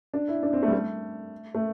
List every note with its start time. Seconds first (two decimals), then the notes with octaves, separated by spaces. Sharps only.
0.14 D4
0.28 E4
0.43 D4
0.53 C4
0.63 A3
0.68 G3
0.73 A3
1.55 A3